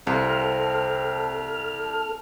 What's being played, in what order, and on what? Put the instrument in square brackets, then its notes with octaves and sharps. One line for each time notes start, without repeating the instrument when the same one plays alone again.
[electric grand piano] C2 [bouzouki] C3 A#3 [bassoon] C4 [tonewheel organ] A4 F6